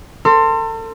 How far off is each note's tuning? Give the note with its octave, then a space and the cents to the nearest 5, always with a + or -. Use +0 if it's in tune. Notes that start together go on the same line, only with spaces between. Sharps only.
A4 +40 C6 +5